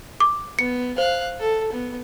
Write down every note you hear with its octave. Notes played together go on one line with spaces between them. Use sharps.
D6
B3 C#7
C5 F5 F#6
A4
B3